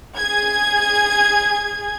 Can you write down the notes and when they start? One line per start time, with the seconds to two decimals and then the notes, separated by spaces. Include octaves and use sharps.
0.17 G#4 G#6